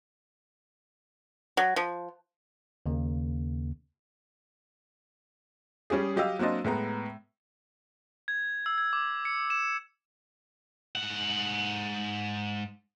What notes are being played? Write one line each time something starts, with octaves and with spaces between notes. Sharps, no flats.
F#3
F3
D#2 C#3 A#3
G3 C#4 G4 G#4
F#3 G4 D#5 F5 E6
F#3 A#3 C4 D4 D#5
A2 G#3 B3 A#5
G#6
E6
G#6
D6
C#7
E7
G#2 F#5